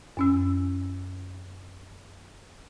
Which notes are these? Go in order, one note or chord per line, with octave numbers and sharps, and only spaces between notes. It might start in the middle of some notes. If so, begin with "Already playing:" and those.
F#2 C#4 E6